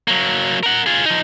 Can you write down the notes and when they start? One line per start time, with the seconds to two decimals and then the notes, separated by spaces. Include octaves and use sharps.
0.08 F#3 A#3
0.63 A#4 F#5
0.86 F4 G#4
1.06 F3 D#4